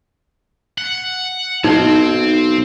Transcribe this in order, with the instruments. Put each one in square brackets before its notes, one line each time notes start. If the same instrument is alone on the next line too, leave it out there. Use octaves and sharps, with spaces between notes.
[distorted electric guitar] F#5
[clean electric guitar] B1 [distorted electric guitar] C4 [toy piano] D#4